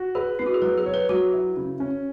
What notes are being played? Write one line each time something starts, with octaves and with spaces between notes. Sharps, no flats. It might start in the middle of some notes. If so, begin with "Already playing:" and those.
Already playing: F#4
G#4 B4
B3 E4
F#4
G#4
F#3 B4
G#4
C#5
B4
F#3 F#4
E4
C#3
C#4